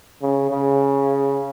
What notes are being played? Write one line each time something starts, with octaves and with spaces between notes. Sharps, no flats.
C#3
C#3